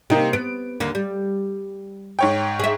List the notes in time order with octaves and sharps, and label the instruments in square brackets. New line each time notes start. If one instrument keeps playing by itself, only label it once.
[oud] C3 [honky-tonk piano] A#3 D#4 G4
[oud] B3 [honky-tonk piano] D7
[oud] D#2 D3 A#3
G3
[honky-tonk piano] G#2 C#5 G5
[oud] G#4 E5